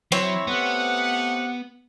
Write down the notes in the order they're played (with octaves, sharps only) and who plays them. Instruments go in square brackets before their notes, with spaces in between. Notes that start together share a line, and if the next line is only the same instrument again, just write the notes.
[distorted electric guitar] F#3 [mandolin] C4 C#5 [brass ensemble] E4
[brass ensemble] A3 G4 F#5 [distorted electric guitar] B3